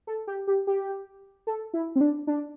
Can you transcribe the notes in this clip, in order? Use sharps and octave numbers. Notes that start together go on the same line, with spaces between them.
A4
G4
G4
G4
A4
E4
C4
D4
D4